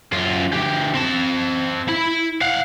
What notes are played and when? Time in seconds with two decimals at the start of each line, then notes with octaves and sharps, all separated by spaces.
0.13 F#2 F4
0.53 D2 G4
0.94 C4 A5
1.88 E4 B5
2.41 F5 F#5